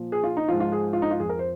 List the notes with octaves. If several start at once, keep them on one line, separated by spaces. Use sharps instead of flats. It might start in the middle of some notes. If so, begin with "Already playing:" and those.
Already playing: A#2 F3
G#4
F4
D#4
G#2 F3 F4
F4
G#4
F4
D#4
F4
F2 F3 G#4
A#4
C5